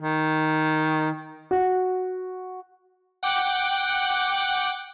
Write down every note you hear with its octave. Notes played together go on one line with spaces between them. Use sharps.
D#3
F#4
F#5 G5 D6 F#6